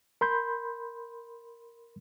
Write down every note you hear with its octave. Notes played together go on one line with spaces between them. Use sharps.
A#4 B5 C6 G6